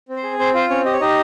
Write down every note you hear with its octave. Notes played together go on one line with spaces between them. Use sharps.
C4
C5
G#4
C4 C5
F4 C5
C4 C#4 C#5
G4 D#5
C#5
D#4 G4 D#5